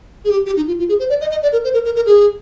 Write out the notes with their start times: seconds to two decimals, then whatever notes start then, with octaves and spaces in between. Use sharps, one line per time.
0.25 G#4
0.30 G4
0.46 G4
0.57 D#4
0.68 F4
0.79 F4
0.89 G#4
0.99 C5
1.10 D5
1.21 D#5
1.31 D#5
1.43 D5
1.53 A#4
1.64 C5
1.74 A#4
1.85 A#4
1.96 A#4
2.06 G#4